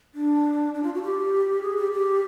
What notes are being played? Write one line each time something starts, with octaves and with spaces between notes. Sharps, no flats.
D4
D4
F4
F#4
G4
G#4
G4
G4